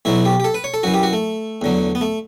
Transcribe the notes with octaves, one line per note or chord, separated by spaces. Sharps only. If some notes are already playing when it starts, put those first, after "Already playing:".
B1 B2 F#3 E4
G4
G4
A4
B4
C#5
A4
F#2 E3 F#4
G4
F#4
A3
E2 D3 F#3
B3
A3